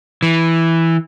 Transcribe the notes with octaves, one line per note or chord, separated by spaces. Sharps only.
E3